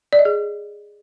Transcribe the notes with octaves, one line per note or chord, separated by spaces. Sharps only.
D5
D#5
G#4